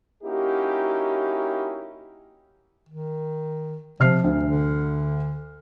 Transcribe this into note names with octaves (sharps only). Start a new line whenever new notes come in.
A#3 C#4 D#4 E4 F#4 G4
D#3
C3 F3 F6 C7
D2
D3